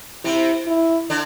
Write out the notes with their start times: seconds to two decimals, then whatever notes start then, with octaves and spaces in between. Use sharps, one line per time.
0.24 C3 C4 E4
0.67 E4
1.10 D3 D4